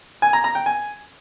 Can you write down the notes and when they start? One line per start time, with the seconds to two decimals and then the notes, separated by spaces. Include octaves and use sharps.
0.22 G#5
0.33 A#5
0.44 A#5
0.55 G5
0.66 G#5